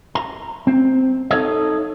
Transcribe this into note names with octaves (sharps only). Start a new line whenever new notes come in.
A#5
C4
D#4 A4 C#5 D#5